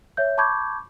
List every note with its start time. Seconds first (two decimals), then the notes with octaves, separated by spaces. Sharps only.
0.17 C#5 E5 G6
0.38 A5 B5 C#6 D6 G6 G#6